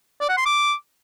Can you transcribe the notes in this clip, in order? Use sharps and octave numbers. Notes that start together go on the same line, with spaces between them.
D5
F#5
C6
D6